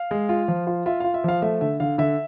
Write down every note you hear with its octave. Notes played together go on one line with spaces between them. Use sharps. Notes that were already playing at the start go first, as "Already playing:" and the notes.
Already playing: F5
G#3
F4
F3
F4
F4 E5
F4 F5
E5
F3 F5
A3 E5
D3 E5
D3 F5
D3 E5